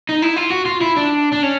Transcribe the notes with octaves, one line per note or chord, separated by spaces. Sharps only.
D#4
E4
F4
F#4
F4
E4
D4
D4
C#4